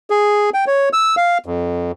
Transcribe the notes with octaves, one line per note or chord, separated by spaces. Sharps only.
G#4
G5
C#5
E6
F5
F2